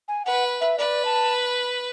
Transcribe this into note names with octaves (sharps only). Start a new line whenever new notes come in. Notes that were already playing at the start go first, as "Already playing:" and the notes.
G#5
B4 F#5
E5
B4 D5
A5